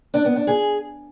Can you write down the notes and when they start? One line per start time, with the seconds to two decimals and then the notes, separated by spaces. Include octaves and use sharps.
0.14 D4
0.25 B3
0.36 D4
0.47 G#4